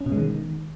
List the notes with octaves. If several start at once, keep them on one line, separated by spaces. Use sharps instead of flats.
C#4
B2
G#3
D#3